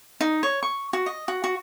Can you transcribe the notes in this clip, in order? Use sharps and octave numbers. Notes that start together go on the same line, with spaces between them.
D#4
C#5
C#6
F#4
D#5
F#4
F#4